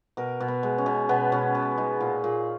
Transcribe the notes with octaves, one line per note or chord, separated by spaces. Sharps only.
B2 A#4
B2
B3
G#3
C#4
B2
B2 B3
B2 C#4
B2
G#3 D#4
A#2 F4
A#2 G#4